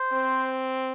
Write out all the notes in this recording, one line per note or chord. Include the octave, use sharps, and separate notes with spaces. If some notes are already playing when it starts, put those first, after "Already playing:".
Already playing: C5
C4